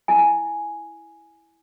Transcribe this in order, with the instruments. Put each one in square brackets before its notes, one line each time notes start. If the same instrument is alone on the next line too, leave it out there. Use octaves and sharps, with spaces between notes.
[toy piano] E4 G#5